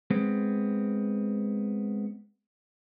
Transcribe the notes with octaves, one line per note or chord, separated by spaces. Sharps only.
G#3 B3 C4